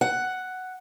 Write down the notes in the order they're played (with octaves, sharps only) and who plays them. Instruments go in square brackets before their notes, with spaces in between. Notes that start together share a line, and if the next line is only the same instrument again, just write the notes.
[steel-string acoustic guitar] F#5